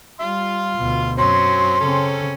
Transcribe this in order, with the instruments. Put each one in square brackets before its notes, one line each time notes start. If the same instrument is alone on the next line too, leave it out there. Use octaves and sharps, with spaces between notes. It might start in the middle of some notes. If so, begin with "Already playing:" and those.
[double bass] G3 [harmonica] F5 C6
[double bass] D2 B2
[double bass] F#2 [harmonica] F#3 C4 C#4 [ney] C6
[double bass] C#3 C4 [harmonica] C#4 A4